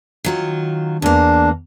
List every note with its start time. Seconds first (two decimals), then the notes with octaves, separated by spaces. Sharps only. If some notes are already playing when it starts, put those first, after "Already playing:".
0.24 D#3 F#3 F4
1.02 E2 A#3 D4